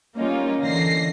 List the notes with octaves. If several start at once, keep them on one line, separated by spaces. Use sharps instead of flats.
G3 A#3 C#4 D#4 F4
D3 E3 A#6 C7